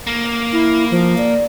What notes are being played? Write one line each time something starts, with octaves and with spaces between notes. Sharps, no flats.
A#3
E4
F3
D5